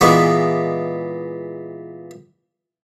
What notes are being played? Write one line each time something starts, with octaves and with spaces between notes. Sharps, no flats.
A#2 E3 G#3 B3 C#6 D6